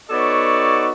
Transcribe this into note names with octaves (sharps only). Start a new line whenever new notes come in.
B3 D#4 F#4 A4 C#5 D5